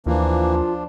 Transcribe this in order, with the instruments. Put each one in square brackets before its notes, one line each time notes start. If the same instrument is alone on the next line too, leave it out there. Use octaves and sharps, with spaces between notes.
[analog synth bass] D#2 [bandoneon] E3 A#3 [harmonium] F3 D4 [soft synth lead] F4